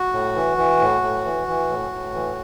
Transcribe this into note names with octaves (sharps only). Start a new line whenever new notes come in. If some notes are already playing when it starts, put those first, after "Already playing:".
Already playing: F#4
A2
E3
E3
A2
A2
E3
E3
A2
A2
E3